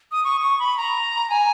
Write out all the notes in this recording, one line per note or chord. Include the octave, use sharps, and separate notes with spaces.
D#6
C#6
C#6
B5
A#5
G#5